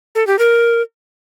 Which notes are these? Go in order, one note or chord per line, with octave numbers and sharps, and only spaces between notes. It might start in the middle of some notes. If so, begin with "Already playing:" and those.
A4
G4
A#4